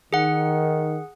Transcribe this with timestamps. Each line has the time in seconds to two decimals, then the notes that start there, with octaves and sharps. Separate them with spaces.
0.13 D#3 G#4 F#5